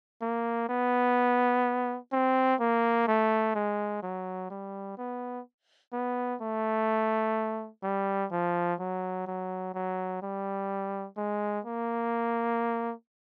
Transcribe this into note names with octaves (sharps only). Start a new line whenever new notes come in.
A#3
B3
C4
A#3
A3
G#3
F#3
G3
B3
B3
A3
G3
F3
F#3
F#3
F#3
G3
G#3
A#3